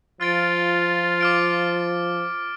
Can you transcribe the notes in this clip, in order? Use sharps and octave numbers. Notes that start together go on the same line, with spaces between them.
F3 F4 F6 A6 D7
D6 F6 D7